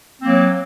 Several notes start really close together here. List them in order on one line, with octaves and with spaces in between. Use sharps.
C4 A#3 F#3